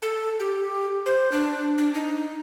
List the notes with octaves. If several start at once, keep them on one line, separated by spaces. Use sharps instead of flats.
A4
G4
C5
D4
D4
D#4